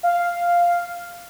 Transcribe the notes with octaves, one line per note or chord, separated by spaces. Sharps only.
F5